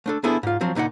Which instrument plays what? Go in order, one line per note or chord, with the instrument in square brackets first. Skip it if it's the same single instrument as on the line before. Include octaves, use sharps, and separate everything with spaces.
[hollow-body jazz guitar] A3 D4 A4
B3 D4 E4 G#4 A4 C5
G#2 F4
F3 F#3 C4
C#2 A#2 D#4 D5 F#5